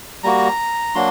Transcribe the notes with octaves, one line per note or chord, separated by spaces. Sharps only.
G3 A#3 F#4 A#5
F#3 A#3 D4 F#4 C6